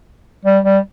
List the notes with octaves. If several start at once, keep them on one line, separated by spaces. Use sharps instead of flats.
G3
G3